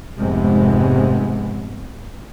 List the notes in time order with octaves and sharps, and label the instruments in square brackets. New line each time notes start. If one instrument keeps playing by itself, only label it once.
[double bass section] F1 G#2 C3 G#3 B3